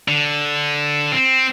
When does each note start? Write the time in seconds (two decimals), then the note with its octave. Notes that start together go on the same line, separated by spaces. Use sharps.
0.08 D3
1.12 C4